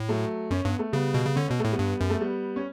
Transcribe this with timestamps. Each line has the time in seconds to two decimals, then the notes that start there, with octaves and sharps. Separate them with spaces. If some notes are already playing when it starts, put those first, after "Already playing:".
Already playing: A2
0.08 F#3 A3
0.51 F#2 C#4
0.65 G2 B3
0.79 A3
0.92 C#3 G3 B3
1.14 B2
1.25 C#3
1.36 D3 C#4
1.48 B2 B3
1.59 A3
1.65 A2
1.72 G3 B3
1.79 G2
2.01 F#2
2.10 A3
2.21 G3 B3
2.56 C#4